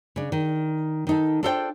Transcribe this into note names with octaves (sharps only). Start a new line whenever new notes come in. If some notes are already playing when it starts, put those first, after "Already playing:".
C#3 D4
D#3
D#3 D#4 A4
D4 F4 A4 C5 E5 G5